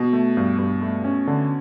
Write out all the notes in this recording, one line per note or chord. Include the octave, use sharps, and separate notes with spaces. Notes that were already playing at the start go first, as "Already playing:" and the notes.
Already playing: B2
A3
G2
G2
A3
C#4
D3